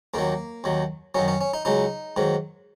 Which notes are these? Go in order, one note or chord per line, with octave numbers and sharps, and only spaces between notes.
D#2 D#3 F#3 A#3
D#2 D#3 F#3
F#2 D#3 F#3 C#4
C#4
C#4
D#4
C#2 C#3 F#3 D#4
G#2 D#3 F#3